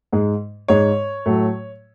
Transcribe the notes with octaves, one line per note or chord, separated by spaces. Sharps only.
G#2 G#3
G#2 G#3 C#5
A2 F#3 A3